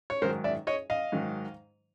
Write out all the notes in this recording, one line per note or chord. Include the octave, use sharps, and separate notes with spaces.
C#5
G#2 D#3 F#3 A#4 C5
D5 E5
C#5 D#5
D#5 F5
G#2 D#3 F#3